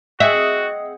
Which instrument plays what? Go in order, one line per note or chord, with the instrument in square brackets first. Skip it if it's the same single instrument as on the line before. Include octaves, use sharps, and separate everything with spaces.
[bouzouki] C4 G#4 F#5 [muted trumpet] F#4 [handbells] D#5 [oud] E5